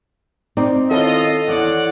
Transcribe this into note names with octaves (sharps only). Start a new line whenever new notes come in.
C4 D#4 D5
D#3 C#4 E4 F4 A4 D#5
E2 C#5 D5 F#5